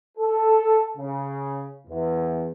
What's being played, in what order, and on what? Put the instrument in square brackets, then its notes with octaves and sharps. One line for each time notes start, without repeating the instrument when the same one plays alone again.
[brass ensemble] A4
C#3
E2